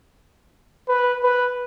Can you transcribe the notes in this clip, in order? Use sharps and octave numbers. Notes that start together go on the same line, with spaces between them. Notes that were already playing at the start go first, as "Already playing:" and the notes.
B4
B4